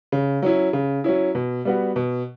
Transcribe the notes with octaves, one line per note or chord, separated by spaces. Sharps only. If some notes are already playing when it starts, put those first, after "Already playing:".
C#3
F#3 C#4 E4
C#3
F#3 C#4 E4
B2
G3 B3 F#4
B2